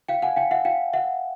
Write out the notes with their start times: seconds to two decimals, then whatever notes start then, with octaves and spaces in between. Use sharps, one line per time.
0.09 F5 G5
0.22 F#5 G#5
0.36 F5 G5
0.51 E5 F#5
0.65 F5 G5
0.93 E5 F#5